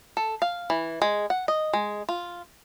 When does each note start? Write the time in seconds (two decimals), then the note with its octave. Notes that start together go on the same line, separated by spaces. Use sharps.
0.17 A4
0.42 F5
0.70 E3
1.02 G#3
1.30 F#5
1.48 D#5
1.73 G#3
2.09 F4